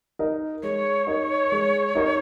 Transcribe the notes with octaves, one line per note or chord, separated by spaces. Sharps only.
D#4 A#4 D#5
G#3 C#5
D#4 A#4 D#5
G#3
D#4 A#4 D#5